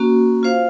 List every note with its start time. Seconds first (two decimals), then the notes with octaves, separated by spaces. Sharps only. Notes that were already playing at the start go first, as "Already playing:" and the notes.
Already playing: A#3 C#4 F#4
0.43 F4 C5 F5